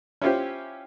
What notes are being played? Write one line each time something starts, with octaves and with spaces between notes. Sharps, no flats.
C#4 E4 F4 G4 C5